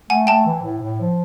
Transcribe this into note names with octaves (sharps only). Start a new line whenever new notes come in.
A3 F#5 G#5
A3 G5 A5
E3
A2
A2
F3